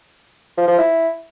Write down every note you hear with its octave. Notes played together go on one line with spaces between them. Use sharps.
F3
F3
E4